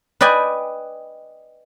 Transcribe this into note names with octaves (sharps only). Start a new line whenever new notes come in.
B4 D5 D#5 G5 G#5